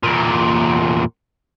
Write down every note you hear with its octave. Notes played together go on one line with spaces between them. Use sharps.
E2 A#2